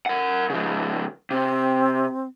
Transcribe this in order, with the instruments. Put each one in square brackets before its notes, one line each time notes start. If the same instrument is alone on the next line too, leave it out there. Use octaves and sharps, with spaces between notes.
[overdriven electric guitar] A#4 F#5
C#3 F3
[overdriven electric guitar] C3 [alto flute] C4